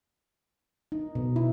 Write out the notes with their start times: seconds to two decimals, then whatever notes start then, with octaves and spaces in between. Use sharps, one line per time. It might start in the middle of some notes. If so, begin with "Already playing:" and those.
0.92 D#4
1.15 B2
1.36 E4